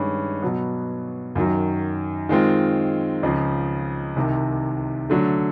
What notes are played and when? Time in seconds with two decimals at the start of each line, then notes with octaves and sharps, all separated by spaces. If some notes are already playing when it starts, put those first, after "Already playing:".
Already playing: G2 D#3 G#3 C#4
0.42 B2 F#3 B3
1.35 F#2 D#3 F#3
2.29 D#3 G#3 C4 F4
3.23 C#2 C#3 F3
4.16 C2 C3 D#3
5.10 D3 F#3 A3